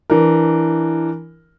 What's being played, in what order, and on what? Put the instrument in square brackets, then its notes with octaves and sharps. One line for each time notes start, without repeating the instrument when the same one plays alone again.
[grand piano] E3 D4 A#4